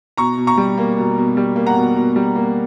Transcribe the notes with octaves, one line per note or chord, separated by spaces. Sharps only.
B2 A#5 C#6
B2
A#5 C#6
G3
A#3
B2
B2
G3
A#3
F#5 A#5
B2
B2
G3
A#3